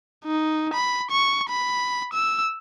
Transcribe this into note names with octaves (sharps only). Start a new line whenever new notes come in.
D#4
B5
C#6
B5
E6